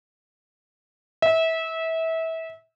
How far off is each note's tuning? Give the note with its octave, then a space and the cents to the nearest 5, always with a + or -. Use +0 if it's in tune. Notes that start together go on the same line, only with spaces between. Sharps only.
E5 -25